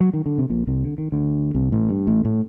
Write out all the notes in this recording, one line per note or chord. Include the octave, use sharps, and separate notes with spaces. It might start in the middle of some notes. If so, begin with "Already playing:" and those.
F#3
D#3
D3
C3
A#1 A#2
C2 C3
D3
D#3
D2 D3
C2 C3
A1 A2
G2
A1 A2
A2